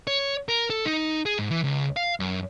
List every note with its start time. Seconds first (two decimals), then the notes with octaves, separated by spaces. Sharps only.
0.07 C#5
0.49 A#4
0.70 A4
0.85 D#4
1.26 G#4
1.38 G#2
1.51 E3
1.64 C#2
1.97 F5
2.20 F#2